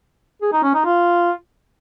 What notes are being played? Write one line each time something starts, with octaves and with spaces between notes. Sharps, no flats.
G#4
D#4
C#4
D#4
F4